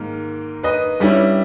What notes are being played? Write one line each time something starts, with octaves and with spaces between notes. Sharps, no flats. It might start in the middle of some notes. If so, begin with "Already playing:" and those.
Already playing: G#2 D#3 A#3 A#4
B4 D#5
G2 G3 C#4 E4